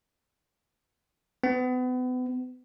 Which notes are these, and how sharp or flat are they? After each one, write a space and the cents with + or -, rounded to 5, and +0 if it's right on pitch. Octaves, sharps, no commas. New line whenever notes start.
B3 +35